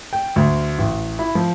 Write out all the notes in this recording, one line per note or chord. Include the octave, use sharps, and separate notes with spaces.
G5
D2
A1
E4
F3